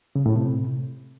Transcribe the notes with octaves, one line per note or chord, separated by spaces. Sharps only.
C#3
A2
C3